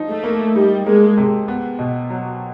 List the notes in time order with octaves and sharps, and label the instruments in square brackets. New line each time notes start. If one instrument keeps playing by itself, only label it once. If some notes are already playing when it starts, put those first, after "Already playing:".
Already playing: [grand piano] F3 D#4
[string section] A3
[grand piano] A#3
[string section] G3 [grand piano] D#4
[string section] G#3 [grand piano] A#3
[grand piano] C3
B3
B2
F#3